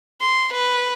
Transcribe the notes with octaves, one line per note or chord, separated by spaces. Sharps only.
C6
B4